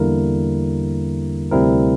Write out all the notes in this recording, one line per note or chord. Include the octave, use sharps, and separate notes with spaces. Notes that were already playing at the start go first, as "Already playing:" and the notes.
Already playing: E2 D3 G3 A#3 E4 A#4
D2 C3 G3 C4 E4 A#4